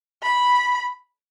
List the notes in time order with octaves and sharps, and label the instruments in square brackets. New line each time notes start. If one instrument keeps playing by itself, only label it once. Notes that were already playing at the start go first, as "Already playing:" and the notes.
[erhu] B5